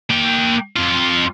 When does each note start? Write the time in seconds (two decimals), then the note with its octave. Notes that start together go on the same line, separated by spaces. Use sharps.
0.10 A#3 G5
0.76 F2 F4